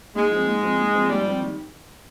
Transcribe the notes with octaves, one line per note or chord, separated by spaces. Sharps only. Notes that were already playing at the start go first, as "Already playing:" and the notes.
G#2 G#3
F3 C4
G#2
F3 C4
G#2
F3 C4
G#2 G3
F3 C4
D#3